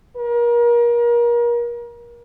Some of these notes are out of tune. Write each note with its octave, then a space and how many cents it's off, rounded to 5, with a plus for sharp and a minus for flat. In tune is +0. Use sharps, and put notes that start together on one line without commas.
A#4 +30